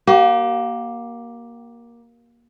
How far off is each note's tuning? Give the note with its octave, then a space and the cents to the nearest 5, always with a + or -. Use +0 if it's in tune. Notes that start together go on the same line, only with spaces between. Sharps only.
A#3 +15 G4 -40